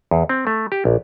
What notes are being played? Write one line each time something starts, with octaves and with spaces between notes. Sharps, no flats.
E2
C4
A3
G4
A#1